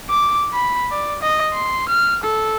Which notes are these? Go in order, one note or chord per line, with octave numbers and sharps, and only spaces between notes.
D6
B5
D5
D#5
C6
F6
A4